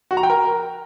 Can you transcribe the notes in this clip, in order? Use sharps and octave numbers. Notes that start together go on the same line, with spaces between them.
F#4
A#5
G5
A#4